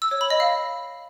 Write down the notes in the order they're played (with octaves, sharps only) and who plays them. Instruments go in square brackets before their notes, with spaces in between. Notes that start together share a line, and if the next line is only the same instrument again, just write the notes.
[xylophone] E6
C#5
B5
D#5
F5